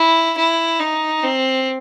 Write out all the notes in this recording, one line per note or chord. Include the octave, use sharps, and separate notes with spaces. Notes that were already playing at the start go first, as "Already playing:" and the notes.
Already playing: E4
E4
D#4
C4